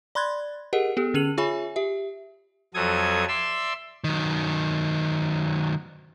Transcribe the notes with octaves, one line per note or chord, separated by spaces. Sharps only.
D5 B5 C6 F#6 G#6 A6
G4 G#4 A#4 D#5 F#5
B3 G4 A4
D3 C#4 G#4 D#7 F7 F#7
F4 G#4 C#5 E5 G#5 B5
G4 E5
F2 F#3 A4 D#6 G#6
D5 E5 C6 E6
D#3 F#3